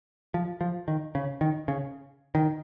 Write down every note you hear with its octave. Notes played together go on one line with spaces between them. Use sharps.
F3
F3
D#3
C#3
D#3
C#3
D#3